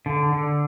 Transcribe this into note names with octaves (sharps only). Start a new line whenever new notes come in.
D3
D3